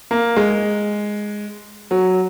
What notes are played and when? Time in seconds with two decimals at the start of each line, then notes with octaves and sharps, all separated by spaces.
0.11 A#3
0.36 G#3
1.91 F#3